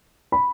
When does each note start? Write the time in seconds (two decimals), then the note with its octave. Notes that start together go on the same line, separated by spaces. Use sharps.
0.32 B5